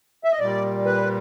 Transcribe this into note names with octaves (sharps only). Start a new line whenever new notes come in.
E5
D#5
A#2 G3 D5
B4